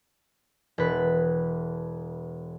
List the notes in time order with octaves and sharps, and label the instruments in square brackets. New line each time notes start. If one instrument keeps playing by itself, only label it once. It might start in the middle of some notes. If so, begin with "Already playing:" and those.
[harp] E1 B4